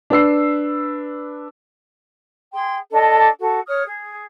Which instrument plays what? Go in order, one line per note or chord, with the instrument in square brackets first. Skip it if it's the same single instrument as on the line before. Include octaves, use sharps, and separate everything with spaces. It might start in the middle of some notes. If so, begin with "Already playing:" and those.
[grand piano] D4 B4 E6 C7
[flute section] G#4 G5 C6
D4 A4 D#5
F#4 A4
C#5 D#6 F6
G#4